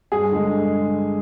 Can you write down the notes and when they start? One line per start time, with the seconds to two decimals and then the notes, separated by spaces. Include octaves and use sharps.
0.12 G2 G#4
0.32 D3 G#3